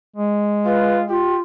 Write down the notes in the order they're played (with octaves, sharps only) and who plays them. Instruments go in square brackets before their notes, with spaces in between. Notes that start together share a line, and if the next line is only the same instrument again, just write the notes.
[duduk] G#3
[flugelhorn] F4 [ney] B4
[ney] F4 [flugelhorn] G4